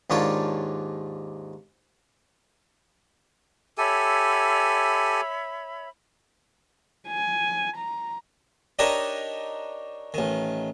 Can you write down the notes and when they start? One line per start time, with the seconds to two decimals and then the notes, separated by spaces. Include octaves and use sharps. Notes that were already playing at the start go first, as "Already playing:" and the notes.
0.10 D#2 G#2 D4 F4 C#5 A5
3.78 G4 A4 C#5 E5 G#5 B5
7.08 G#5
7.77 A#5
8.79 D4 D#4 G4 A#4 C#5
10.14 A1 D#3